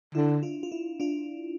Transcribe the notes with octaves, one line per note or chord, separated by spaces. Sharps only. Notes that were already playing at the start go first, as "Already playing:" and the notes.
D3 E4
D4 F4
F4
E4
D4 F4